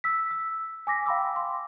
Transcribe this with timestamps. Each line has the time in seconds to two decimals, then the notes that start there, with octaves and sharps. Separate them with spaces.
0.04 E6 B6
0.31 E6
0.87 G#5 D6 A#6 B6
1.06 F5 G5 B5 C6 D6 E6
1.36 C6